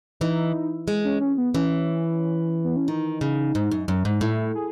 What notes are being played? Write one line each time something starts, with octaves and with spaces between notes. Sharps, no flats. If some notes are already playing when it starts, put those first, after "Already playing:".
E3 D#4
G#3
C#4
C#4
B3
E3 C#4
B3
C#4
D#3 D#4
C#3
G#2
F#2
F#2
G#2
A2 E4
G#4